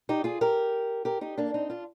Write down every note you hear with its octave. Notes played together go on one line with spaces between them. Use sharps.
D#4 G4
F4 G#4
G4 A#4
G4 A#4
D#4 G4
A#3 D4
C4 D#4
D4 F4